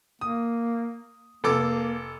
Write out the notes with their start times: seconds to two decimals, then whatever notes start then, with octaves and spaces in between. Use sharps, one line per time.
0.21 A#3 D#6
1.44 F1 A#3 A4 D6